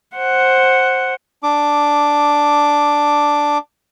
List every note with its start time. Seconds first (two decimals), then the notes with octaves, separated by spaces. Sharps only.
0.16 C5 F#5
1.43 D4 D6